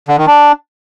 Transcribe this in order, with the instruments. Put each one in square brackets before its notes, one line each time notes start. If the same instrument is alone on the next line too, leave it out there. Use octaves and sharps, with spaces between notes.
[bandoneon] D3
D#3
D4